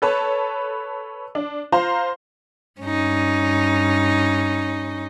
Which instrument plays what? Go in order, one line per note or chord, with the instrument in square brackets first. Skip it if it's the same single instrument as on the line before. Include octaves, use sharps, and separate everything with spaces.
[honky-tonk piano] A4 B4 C#5 A5
D4
F4 C5 F5 A#5
[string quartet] G2 C#4 D#4